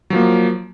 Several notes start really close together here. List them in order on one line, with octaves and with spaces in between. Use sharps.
F#3 F3 A#3